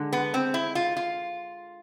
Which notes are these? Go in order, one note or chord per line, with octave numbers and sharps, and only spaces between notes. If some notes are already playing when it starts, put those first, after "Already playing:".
Already playing: D3 G#3
B3
C4
E4
F4
F4